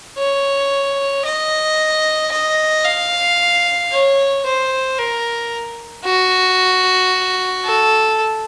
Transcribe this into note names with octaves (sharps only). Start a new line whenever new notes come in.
C#5
D#5
D#5
F5
C#5
C5
A#4
F#4
A4